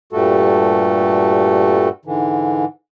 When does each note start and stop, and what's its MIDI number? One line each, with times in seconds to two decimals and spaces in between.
0.13 1.89 43
0.13 1.89 46
0.13 1.89 55
0.13 1.89 57
0.13 1.89 66
0.13 1.89 69
2.05 2.65 44
2.05 2.65 50
2.05 2.65 52